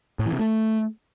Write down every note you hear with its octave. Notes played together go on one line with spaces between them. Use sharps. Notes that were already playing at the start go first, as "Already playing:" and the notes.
A2
E3
C3
A3